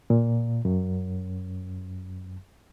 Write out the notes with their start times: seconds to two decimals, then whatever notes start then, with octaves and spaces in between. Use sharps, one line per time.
0.10 A#2
0.65 F#2